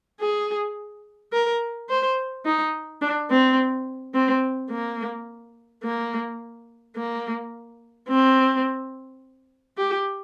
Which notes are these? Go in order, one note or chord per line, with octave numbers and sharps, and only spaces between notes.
G#4
A#4
C5
D#4
D4
C4
C4
A#3
A#3
A#3
C4
G4